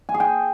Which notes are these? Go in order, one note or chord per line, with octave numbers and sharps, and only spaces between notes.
G#5
G#4
G5